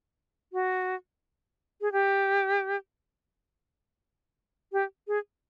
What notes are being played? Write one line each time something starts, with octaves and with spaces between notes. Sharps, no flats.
F#4
G#4
G4
G4
G#4